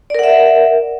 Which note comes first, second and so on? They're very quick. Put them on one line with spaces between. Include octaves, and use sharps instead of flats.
D5 A#4 F#5 E5